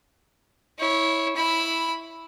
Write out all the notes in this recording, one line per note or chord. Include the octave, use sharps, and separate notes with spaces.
E4 C#5
E4 B5